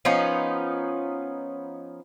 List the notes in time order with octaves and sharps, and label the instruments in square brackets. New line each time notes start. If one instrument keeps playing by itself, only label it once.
[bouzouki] F3 B3 C#4 D#4